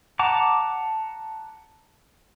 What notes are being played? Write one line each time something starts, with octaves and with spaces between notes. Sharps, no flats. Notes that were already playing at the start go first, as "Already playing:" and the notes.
F#5 A5 A#5 D6